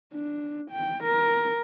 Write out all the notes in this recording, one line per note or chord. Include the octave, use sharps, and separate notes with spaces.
D4
G5
A#4